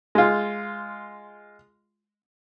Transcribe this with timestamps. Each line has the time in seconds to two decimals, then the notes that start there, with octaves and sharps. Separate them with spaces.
0.15 G#3 F4